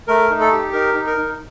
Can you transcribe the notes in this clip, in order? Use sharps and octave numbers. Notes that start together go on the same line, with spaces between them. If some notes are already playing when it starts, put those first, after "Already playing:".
A3 A#4
D#4
A4
G4
D#4 A#4
D#4
A#4
D#4